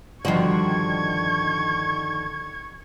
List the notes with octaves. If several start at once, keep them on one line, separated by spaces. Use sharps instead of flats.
G2 D3 D#3 F3 G3 F#4 C#6 G#6